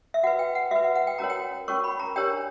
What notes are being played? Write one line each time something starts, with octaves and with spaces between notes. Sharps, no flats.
E5
F#4 B4 F#5
G5
F#5
F#4 B4 E5
F#5
F#5
G5
C#4 F#4 A#4 C#5 A#5
G5
C#4 F#4 A#4 C#5 C#6
B5
A#5
D4 G4 A#4 C#5 G5